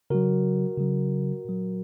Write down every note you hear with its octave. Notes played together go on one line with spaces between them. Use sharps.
C#3 F#3 F#4 A#4
C#3 F#3
A#2 F#3